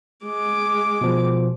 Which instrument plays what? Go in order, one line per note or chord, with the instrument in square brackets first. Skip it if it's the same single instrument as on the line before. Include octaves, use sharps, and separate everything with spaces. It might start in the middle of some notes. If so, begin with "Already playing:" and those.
[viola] G#3 D6
[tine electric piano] B2 F3